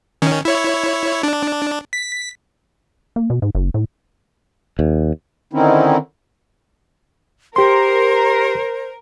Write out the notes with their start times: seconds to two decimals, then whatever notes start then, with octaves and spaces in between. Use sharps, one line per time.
0.22 D#3 C#4
0.45 E4 C#5
1.23 D4
1.93 B6
3.16 A#3
3.30 B2
3.42 G#2
3.55 F#1
3.74 A2
4.79 D#2
5.53 D3 D#3 C4 C#4 D#4 E4
7.56 G4 A#4 C5 C6